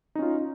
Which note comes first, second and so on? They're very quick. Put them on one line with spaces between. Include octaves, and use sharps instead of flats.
D#4 C#4 F4